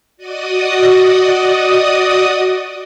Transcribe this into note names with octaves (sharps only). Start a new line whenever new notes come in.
F#4 D5 D#5 D#6